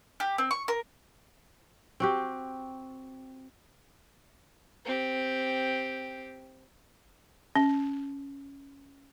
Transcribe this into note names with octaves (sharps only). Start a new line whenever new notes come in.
G4
C4
C#6
A#4
C4 F#4 G4
C4 G4
C#4